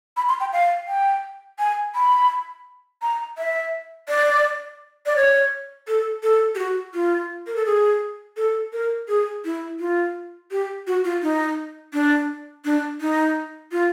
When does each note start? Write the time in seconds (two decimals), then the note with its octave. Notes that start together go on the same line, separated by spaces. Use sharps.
0.17 B5
0.29 C6
0.40 G5
0.53 F5
0.88 G5
1.59 G#5
1.95 B5
3.02 A#5
3.38 E5
4.09 D5
5.06 D5
5.16 C#5
5.88 A4
6.23 A4
6.55 G4
6.59 F#4
6.94 F4
7.47 A#4
7.56 A4
7.66 G#4
8.37 A4
8.73 A#4
9.08 G#4
9.45 E4
9.80 F4
10.51 G4
10.87 F#4
11.05 F4
11.23 D#4
11.94 D4
12.65 D4
13.01 D#4
13.72 F4